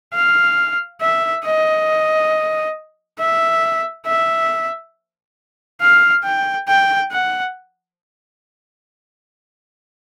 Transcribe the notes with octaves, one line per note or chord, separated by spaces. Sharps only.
F5
E5
D#5
E5
E5
F5
G5
G5
F#5